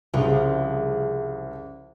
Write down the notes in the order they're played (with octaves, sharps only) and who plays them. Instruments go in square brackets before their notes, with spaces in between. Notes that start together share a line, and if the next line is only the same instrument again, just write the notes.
[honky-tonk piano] C2 C#3 [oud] F3